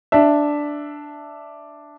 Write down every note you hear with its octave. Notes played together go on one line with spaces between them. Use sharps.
D4 E5